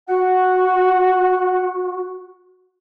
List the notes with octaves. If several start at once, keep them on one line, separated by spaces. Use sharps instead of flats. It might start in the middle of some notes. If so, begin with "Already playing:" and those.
F#4 F#5